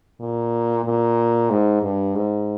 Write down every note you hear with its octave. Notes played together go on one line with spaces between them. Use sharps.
A#2
A#2
G#2
G2
G#2